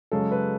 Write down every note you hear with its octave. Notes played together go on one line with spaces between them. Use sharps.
F#2 C#3 G#3 C#4 A4
B4